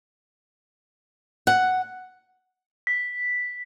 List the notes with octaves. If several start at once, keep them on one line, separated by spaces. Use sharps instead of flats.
F#5
B6